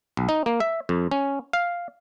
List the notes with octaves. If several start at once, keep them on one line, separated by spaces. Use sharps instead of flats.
B1
D#4
A#3
E5
F2
C#4
F5